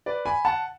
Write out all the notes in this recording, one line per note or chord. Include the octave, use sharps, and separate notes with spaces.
B4 D5
G#5 B5
F#5 A5